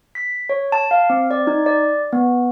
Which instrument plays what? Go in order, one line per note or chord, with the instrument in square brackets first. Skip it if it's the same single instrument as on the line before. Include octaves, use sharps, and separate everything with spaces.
[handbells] B6
C#5
A5
F5
C4
D5
D#4
D5
B3